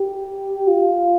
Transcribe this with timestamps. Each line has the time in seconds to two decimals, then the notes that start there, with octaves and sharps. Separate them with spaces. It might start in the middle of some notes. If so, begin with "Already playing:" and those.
Already playing: G4
0.68 F4